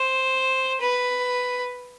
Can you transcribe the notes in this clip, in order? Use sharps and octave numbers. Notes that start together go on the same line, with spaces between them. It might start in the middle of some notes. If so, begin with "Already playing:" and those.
Already playing: C5
B4